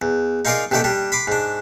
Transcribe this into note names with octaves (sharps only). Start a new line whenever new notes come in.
E2
D#4 F4 G#4 A#4 D5 D#5
A1 D#2 D#3 A3 D5 G5
G3 D4
B5 C6 D6
G#2 D4